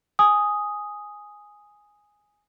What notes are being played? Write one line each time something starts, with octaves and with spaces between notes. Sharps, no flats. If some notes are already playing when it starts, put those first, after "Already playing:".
G#5 D#6